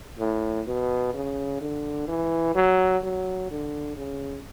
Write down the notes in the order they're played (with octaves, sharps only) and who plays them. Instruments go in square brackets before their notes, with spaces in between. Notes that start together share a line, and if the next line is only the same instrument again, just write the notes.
[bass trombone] A2
B2
C#3
D3
E3
F#3
F#3
D3
C#3